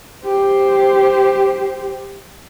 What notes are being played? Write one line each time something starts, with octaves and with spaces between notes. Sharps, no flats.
G4 C5